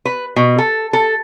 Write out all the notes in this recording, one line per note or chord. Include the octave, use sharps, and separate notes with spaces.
B4
B2
A4
A4